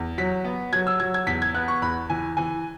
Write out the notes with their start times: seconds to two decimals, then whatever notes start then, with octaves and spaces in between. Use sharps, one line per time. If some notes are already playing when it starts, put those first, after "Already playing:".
Already playing: E2
0.18 F#3 B6
0.44 B3
0.73 F#3 G#6
0.87 E6
1.00 F#3 G#6
1.14 G#6
1.27 E2 B6
1.42 G#6
1.54 B3 F#6
1.68 C#6
1.82 E2 B5
2.10 E3 G#5
2.37 E3 G#5